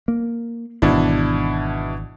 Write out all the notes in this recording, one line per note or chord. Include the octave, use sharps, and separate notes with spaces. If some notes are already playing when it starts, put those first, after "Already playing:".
A#3
G#1 B2 E3 D4 E4